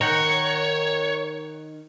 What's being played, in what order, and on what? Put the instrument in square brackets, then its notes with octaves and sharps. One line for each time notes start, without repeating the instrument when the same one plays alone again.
[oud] D#3 [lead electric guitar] C#5 [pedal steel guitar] F#5 G5 A#5